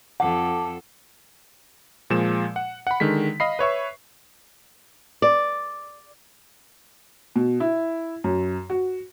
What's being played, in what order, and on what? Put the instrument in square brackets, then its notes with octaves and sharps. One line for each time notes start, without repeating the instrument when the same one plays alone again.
[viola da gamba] F2 A4 [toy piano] F#5 [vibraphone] A5 D6
[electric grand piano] A#2 F3 G#3 E7
F#5
F#5 B5
D3 D#3 G#3 B6
D#5 F5 B5 C7
B4 C#5 E5 C#6
[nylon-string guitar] D5
[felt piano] B2
E4
F#2
F#4